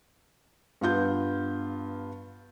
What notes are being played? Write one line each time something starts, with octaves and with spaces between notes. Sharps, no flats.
G2 B3 F4 G6